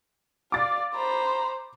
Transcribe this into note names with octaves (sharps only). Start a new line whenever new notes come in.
D5 F5 D6 A6
C5 A#5 B5